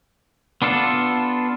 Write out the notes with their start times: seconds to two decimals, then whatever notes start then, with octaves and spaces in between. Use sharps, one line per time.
0.62 B3 D4 F4 A4